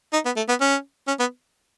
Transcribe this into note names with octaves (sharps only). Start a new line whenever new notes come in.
D#4
B3
A3
B3
C#4
C#4
B3